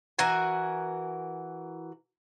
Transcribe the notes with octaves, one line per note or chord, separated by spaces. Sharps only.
E3 F#4 A#4 G#5